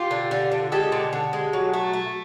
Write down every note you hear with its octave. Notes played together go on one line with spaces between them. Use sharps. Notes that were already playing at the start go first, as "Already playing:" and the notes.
Already playing: F4 G4
D3
D3
D3
G#3 G4 A4
D3
D3
G#3
F#3
A3
A3